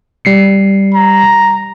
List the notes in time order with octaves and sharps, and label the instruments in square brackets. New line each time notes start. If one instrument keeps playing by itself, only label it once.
[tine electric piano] G3 C7 C#7
[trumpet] A#5